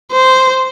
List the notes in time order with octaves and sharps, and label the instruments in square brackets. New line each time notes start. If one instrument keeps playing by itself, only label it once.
[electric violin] C5